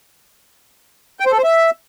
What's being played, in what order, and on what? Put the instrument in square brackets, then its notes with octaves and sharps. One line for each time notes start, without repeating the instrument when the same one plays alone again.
[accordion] G5
C5
A4
C5
E5